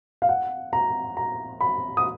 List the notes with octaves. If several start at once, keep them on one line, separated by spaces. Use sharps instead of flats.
F5
F#5
A#5
A#5
B5
D#6